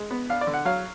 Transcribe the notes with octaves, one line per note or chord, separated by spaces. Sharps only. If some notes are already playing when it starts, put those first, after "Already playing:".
Already playing: G#3
B3
D4 F5
D5
D3
F#5
F#3 F5